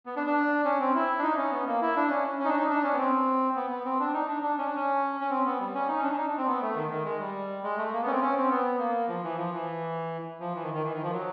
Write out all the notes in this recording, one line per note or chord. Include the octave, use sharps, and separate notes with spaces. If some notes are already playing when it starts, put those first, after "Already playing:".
B3
D4
D4
C#4
C4
E4
D4
D#4
C#4
B3
A#3
E4
D4
C#4
C#4
D#4
D4
D#4
D4
C#4
B3
C4
B3
B3
C4
D4
D#4
D4
D4
C#4
D4
C#4
C#4
C4
B3
G3
C#4
D#4
C#4
D4
D4
D#4
D4
C4
B3
A3
D#3
D#3
G#3
G3
G#3
A3
A#3
B3
C#4
C4
C#4
C4
B3
A#3
F3
E3
F3
E3
F3
E3
D#3
D#3
E3
D#3
F3
F#3